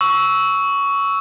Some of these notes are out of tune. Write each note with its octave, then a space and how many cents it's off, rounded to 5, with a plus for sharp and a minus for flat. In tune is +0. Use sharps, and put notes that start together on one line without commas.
C#6 +10 E6 -10